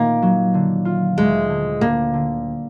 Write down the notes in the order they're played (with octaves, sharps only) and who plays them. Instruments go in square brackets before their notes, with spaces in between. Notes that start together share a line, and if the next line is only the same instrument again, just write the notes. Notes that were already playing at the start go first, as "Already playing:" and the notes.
Already playing: [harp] A#2 D#3 D#4 [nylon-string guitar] A#3
[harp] F#3
D3
F4
[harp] D2 [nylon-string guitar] G#3
[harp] D3
[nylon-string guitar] A#3 [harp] D4
[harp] D3